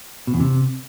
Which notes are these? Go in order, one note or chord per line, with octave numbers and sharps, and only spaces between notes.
B2
E2
C3